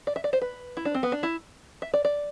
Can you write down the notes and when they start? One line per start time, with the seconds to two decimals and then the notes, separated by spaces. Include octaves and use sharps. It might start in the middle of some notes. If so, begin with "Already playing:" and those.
0.07 D5
0.16 E5
0.24 D5
0.33 C5
0.42 B4
0.77 E4
0.85 D4
0.95 C4
1.03 B3
1.12 D4
1.23 E4
1.82 E5
1.94 D5
2.05 D5